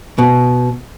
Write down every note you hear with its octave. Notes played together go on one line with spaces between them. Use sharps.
B2